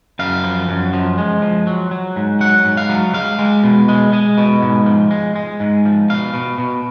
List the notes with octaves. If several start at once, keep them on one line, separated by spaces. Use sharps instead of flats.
F#2 F5
F3
F#2
F3
G#3
F3
F#3
F#3
G#2
F#3 F#5
G#2
F5
F#3
G#3 F5
G#3
B2
G#3
G#3
B2
G#2
F3
G#3
G#3
G#2
F3
B2 F5
B2
B2